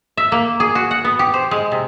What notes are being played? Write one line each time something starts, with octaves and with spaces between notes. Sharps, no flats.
E5
A#3
G#4
F#4
F#5
B3
G4
C5
G#3
C3